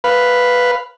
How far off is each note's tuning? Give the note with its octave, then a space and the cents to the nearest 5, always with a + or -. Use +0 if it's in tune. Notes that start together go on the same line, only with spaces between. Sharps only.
B4 +0 F5 +0